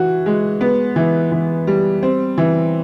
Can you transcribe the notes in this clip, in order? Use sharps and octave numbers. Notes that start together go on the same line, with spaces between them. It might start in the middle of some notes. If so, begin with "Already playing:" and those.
Already playing: E3 F#4
G#3
B3
E3
E3
G3
C4
E3